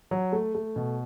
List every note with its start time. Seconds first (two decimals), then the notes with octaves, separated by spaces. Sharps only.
0.11 F#3
0.32 A3
0.55 A3
0.76 B2